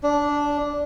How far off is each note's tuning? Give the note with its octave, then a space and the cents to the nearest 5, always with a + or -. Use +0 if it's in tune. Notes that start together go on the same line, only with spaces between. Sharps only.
D4 -10